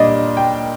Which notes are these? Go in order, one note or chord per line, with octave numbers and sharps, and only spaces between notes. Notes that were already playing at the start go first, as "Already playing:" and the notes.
Already playing: A#2 G3 A#3 D4 D5 D#5
G5